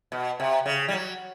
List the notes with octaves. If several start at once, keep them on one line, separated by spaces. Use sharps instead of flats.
B2
C3
C#3
G3
F#3